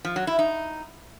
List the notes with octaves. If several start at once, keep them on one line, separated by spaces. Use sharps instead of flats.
F3
F#3
E4
D#4